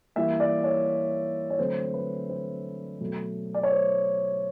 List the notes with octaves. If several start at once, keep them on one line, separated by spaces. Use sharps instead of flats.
E3 G3 A#3 E5
D5
C#5
C#5
D3 F#3 A3 C4 C5
B4
C5
B2 F#3 A3
D5
C#5
C5